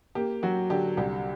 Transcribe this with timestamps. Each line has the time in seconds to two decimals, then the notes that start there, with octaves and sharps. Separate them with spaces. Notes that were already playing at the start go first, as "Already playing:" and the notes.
0.15 A#3 G4
0.43 F#3 F#4
0.70 D3 G4
0.97 C2 G4